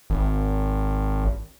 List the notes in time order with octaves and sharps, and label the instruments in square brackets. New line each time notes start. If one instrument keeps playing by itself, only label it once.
[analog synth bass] G#1